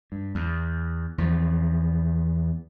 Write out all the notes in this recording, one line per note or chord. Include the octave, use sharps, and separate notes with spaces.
G2
E2
E2 F3